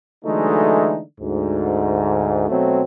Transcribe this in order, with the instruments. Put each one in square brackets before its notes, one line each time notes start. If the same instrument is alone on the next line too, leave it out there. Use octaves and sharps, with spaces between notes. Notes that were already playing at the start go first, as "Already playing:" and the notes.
[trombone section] D3 E3 F#3 G#3 A3 D#4
D2 G#2
B2 F#3 A3 C4